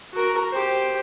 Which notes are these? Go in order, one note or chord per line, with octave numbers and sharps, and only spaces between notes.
F#4 A#4
G4 C5